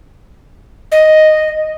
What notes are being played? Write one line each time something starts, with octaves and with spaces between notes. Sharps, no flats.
D#5